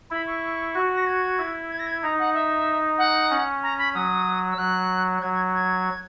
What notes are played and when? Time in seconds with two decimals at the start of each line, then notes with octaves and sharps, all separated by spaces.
0.11 E4 B5
0.27 C#6
0.75 F#4
0.95 A#6
1.07 G#6
1.38 E4
1.70 G#6
1.79 A#6
1.86 G#6
2.03 D#4 A#5
2.19 F#5
2.34 E5
2.98 F#5
3.30 C#4
3.63 A#5
3.78 B5
3.94 F#3 D#6
4.51 E6
4.58 F#3 F#6
5.14 F#6
5.22 F#3 G#6
5.33 G#6
5.54 G#6